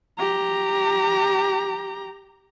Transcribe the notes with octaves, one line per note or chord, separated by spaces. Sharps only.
G4 A#5